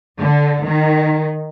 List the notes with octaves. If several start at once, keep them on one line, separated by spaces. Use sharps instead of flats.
D3
D#3